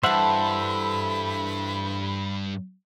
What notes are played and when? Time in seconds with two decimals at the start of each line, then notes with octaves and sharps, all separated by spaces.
0.03 G2 E3 A4 C5 E5 F#5 B5